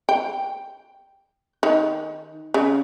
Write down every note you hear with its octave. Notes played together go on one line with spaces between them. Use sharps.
G5
D#3
C#3